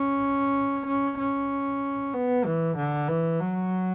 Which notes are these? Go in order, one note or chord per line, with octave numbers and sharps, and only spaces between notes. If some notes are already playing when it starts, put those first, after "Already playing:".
Already playing: C#4
C#4
C#4
B3
E3
D3
E3
F#3